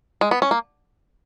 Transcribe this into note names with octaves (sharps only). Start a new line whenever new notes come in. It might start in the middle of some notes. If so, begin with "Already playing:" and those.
G#3
B3
C#4
A#3